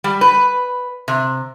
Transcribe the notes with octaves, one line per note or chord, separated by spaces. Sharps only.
G3
B4
C3